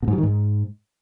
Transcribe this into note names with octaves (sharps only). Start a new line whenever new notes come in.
B2
G#2
F#3
D#3
G#2